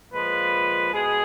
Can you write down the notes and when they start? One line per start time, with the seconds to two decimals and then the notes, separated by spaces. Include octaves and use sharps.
0.12 A#2 F3 G#3 B4
0.92 B2 G#3 G#4